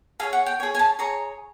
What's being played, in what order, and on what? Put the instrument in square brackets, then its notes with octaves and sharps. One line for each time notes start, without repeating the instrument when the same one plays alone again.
[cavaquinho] G#4 F5
C#5
F#5
G5
G#4 C#5
G#5
A5
G#4 C#5 A#5